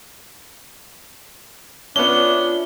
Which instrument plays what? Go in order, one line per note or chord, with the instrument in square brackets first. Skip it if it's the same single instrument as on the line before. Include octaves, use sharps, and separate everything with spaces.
[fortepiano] B3 C#4 [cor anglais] D4 [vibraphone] F4 D5 E5 [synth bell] G7